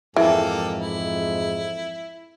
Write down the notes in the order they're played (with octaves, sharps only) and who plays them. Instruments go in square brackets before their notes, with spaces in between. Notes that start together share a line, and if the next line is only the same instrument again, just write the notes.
[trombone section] F2 G#2 [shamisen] E3 [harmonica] A#3 G4 A4
[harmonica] E4